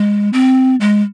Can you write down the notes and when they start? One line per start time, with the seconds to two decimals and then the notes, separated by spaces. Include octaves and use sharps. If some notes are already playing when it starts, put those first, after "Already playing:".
Already playing: G#3
0.33 C4
0.81 G#3